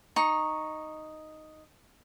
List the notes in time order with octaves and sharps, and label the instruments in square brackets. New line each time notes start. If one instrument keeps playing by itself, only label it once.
[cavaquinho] D#4 C#6